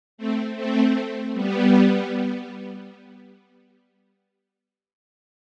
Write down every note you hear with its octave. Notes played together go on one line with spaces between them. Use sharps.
A3 C4
A3 C4
G3 B3